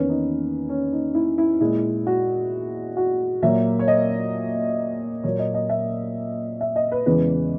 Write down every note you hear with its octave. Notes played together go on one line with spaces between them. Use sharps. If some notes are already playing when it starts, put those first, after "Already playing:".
Already playing: E2 D#3 A#3 C#4 B4
D#4
C#4
D#4
E4
E4
A#2 G#3 E4
F#4
F#4
A#2 F#3 A#3 E5
C#5
D#5
A#2 F#3 A#3 C#5
D#5
D#5
E5
E5
D#5
B4
E2 C#3 E3 G#3 B4